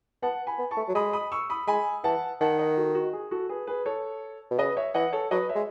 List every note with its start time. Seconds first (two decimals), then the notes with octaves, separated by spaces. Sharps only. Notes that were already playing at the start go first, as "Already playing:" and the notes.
0.23 B3 F#5 A5
0.47 G#5 B5
0.59 B3
0.71 A5 C#6
0.77 A3
0.88 F#3
0.95 G#3 B5 D#6
1.13 B5 D#6
1.32 C#6 E6
1.50 B5 D#6
1.67 G#3 G#5 B5
2.04 E3 F#5 A5
2.41 D#3 F#5 A5
2.59 D#5 F#5
2.77 F#4 A4
2.95 F#4
3.13 G#4
3.31 F#4 A4
3.49 G#4 B4
3.67 G#4 B4
3.86 A4 C#5
4.51 B2
4.58 C#3 B4 D#5
4.77 C#5 E5
4.94 E3 D#5 F#5
5.12 A4 C#5
5.31 F#3 B4 D#5
5.49 C#5 E5
5.55 G#3